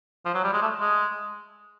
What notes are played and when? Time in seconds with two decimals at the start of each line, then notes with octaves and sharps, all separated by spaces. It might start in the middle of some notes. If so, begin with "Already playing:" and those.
0.25 F3
0.34 F#3
0.44 G3
0.53 G#3
0.62 A3
0.80 G#3